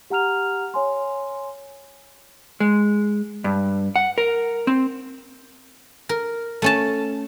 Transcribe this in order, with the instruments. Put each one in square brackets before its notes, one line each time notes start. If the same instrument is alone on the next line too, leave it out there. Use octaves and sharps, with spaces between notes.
[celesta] G4 F#5 A#5 F6 F7
C#5 G#5 C6
[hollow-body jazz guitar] G#3
G2
F#5
A#4
C4
[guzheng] A#4
A3 C#4 A5